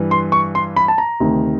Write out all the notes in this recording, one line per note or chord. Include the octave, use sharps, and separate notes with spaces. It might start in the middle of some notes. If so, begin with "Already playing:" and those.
Already playing: G2 E3
C6
C#6
C6
B5
A5
A#5
D2 C3 D#3